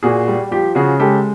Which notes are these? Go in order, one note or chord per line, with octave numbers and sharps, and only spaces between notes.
A#2 F#4 G#4
G3
F3 G4
C#3 F#4 G#4
G#3 G4 A4